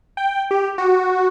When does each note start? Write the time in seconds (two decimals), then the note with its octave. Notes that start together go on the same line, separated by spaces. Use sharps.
0.17 G5
0.51 G4
0.78 F#4